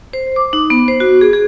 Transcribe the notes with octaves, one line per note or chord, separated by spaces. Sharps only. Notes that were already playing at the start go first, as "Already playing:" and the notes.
C5
D6
D#4
B3
C5
F#4
G#4
G#4